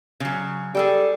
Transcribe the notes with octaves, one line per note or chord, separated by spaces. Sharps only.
C#3 F#3
G3 G#4 A4 G5